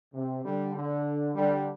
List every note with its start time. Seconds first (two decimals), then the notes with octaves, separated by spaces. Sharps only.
0.14 C3
0.44 D3 G3
0.75 D3
1.35 D3 G3